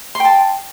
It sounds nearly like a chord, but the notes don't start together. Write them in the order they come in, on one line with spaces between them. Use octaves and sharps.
C6 G5 A5